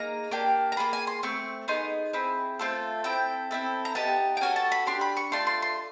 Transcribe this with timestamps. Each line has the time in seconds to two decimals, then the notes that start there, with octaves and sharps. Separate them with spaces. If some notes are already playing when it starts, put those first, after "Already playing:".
Already playing: A#3 D#4 G#4 A#5
0.31 A#3 D4 G4
0.72 A#5
0.77 A#3 D4 F4 G#4 B5
0.93 G#5
1.07 C6
1.23 A3 C4 C#6
1.68 B3 D#4 G#4 C6
2.13 C4 E4 G#4
2.59 A3 C4 F4 A4
3.04 C4 E4 A4 G5
3.51 C4 E4 A4
3.85 A#5
3.95 B3 D#4 G4 A5
4.37 G5
4.41 C#4 F#4 A4 G#5
4.56 A5
4.72 B5
4.87 D4 G4 C6
5.01 B5
5.17 C#6
5.32 A3 D4 F4 C6
5.47 C6
5.62 C6